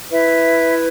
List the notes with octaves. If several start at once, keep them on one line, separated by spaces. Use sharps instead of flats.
E4 B4 E5